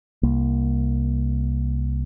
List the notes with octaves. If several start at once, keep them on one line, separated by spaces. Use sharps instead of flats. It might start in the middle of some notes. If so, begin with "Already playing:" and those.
C2 A#3